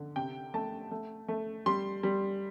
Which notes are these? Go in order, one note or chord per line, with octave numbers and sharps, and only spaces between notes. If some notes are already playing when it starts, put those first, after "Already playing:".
Already playing: D3
C3 G5
A3 A5
A3
A3
G3 C6
G3